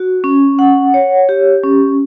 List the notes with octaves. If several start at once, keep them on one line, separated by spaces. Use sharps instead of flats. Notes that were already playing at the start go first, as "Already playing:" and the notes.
Already playing: F#4
C#4
F#5
C#5
G4
C#4